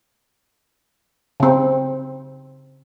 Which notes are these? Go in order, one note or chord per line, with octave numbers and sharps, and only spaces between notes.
C#3 C4